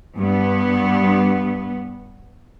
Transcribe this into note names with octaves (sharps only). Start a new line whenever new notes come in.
G2 B3